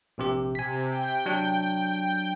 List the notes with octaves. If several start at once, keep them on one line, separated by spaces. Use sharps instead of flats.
A#1 C3 G4
C3 G#5 B6
G5 G6
F#3 D4